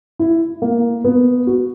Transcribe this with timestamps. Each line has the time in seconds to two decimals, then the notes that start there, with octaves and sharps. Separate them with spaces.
0.19 E4
0.62 A#3
1.04 B3
1.47 F#4